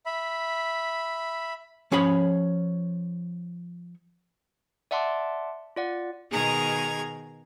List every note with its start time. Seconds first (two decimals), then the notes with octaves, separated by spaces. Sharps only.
0.06 E5 B5
1.92 F3 C#4 G#4 C#5 B5
4.91 D5 E5 F#5 A5 C6 D6
5.76 F4 D5 F#5
6.31 B2 D#3 G#4 A#5 G#6